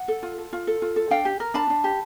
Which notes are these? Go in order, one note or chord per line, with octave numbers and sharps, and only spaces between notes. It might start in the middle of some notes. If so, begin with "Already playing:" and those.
Already playing: F#5
A4
F4
A4
F4
A4
F4
A4
D4 F5 G5
G4
A#4
D4 A5 B5
D4
G4